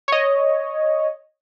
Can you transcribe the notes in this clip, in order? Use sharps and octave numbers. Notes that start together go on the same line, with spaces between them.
C#5 D#5